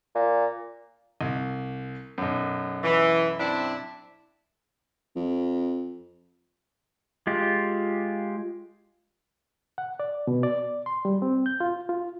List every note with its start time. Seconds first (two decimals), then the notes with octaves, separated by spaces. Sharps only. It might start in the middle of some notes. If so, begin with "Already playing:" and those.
0.15 A#2
1.21 C2
2.18 B1 F#2
2.83 E3
3.39 C4 D4 E4
5.16 F2
7.27 G#3 F4 G4
9.78 F#5
10.00 D5
10.27 B2
10.43 D5
10.86 C6
11.05 G3
11.22 C4
11.46 G6
11.60 F4
11.89 F4